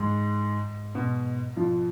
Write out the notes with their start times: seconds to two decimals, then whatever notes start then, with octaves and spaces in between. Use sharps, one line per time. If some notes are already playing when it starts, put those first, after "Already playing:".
Already playing: G#2 G#3
0.95 B2
1.57 F2 F3